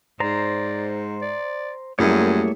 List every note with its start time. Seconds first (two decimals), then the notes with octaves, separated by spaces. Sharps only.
0.20 G#2 C5 D5 A#5
1.22 D5
1.99 F#2 G3 A3 A#3 E4 G#4 C#5